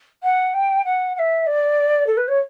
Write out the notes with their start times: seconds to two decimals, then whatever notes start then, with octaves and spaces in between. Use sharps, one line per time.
0.22 F#5
0.53 G5
0.84 F#5
1.15 F#5
1.18 E5
1.46 D5
2.06 A4
2.17 B4
2.28 C#5